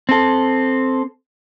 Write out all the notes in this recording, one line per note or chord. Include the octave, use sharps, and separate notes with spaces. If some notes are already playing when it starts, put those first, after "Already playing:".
C4 A4